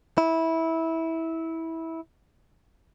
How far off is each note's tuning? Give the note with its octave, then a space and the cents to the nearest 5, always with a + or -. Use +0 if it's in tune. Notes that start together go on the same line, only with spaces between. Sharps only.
E4 -15